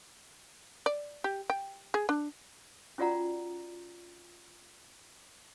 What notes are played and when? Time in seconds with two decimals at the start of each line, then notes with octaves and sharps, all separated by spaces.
0.86 D5
1.24 G4
1.50 G5
1.94 G#4
2.09 D4
2.98 C#4 F4 F#4 D5 F#5 A#5